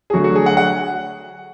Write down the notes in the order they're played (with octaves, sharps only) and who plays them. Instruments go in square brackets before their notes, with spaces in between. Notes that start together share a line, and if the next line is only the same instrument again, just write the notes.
[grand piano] G#4
D3 F#3 A3 F#4
F#4
G#4
F#5
F#5